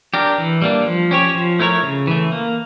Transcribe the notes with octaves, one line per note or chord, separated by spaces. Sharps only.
D4 G4 A#4
E3
G3 A#3 D4
F3
C#4 G4 C#5
F3
A3 E4 A#4 C#5
C#3
E3 A3
A#3